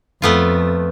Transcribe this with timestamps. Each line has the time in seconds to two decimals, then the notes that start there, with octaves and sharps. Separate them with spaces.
0.22 F2 A3 B3 F4